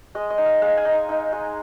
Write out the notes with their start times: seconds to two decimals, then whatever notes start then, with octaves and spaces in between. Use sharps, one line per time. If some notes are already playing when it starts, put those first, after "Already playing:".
0.15 G#3 D#5
0.30 D#5
0.38 D#4
0.46 F5
0.62 G#3 F5
0.77 G#5
0.85 D#4
0.93 A#5
1.09 D#4
1.32 G#3